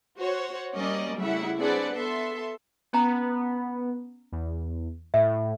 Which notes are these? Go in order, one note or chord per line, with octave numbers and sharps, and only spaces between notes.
F#4 C5 C#5 F#5
G3 A#3 C#4 A#4 D5 D#5
A2 C#3 G3 E4 E5 F#5
C4 D4 G#4 B4 D5 F#5
B3 A4 E5 C6
B3 C#4 A#5
E2
A2 E5